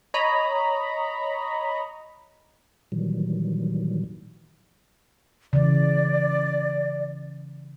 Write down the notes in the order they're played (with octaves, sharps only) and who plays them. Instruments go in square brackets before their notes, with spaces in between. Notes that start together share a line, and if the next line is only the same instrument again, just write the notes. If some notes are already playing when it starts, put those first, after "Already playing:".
[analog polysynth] C#5 D#5 A#5 B5
[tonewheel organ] A#2 D#3 E3 F#3 G3
[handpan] C#3 E3 [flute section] D5